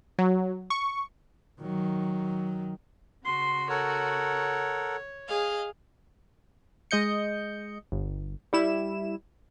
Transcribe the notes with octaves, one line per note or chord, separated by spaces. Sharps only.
F#3
C#6
D#3 F#3
C#3 F#4 C6
A4 A#4 C#5 F#5
G#4 D#5 F5
G#3 D#5 G6 C#7
G1
G3 E4 E7